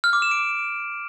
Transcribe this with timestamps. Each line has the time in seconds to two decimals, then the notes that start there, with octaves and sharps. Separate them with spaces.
0.04 F6
0.13 D6
0.22 E7
0.31 D7